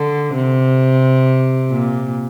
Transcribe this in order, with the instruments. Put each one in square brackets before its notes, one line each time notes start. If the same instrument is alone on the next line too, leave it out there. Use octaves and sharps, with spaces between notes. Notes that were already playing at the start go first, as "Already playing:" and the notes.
Already playing: [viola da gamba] D3
C3
A#2